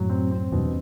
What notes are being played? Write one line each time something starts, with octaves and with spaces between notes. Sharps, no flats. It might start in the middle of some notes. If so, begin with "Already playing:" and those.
Already playing: F#2 A2 F#3
C4
C4
E2 G2 B2